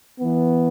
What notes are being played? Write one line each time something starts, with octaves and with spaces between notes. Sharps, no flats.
E3 B3